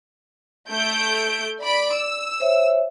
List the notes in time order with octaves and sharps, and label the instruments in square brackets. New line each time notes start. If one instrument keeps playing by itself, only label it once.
[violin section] A3 G6 D7
D5 B5 D7
E6
[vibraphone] C5 C#5 E5